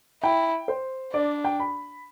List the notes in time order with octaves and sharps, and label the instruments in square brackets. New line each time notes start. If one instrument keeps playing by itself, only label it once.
[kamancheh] E4 [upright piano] G5
[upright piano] C5
[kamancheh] D4 [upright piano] D5
[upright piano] G5
B5